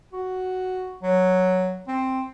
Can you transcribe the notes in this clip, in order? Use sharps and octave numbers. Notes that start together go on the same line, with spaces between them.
F#4
F#3
C4